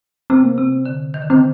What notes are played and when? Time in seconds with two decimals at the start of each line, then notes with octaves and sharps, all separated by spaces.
0.30 C3 C4
0.43 A#3
0.58 C3 C4
0.86 D3
1.14 D#3
1.22 D3
1.30 D#3 C4